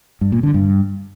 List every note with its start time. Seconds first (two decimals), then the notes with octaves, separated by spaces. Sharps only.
0.21 G2
0.32 A#2
0.43 D3
0.54 G2